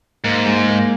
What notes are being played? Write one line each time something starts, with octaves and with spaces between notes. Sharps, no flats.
G#2 A#3
G#3
A#3